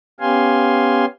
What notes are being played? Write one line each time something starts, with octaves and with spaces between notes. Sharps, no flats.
B3 C#4 G4 F5 G#5 C6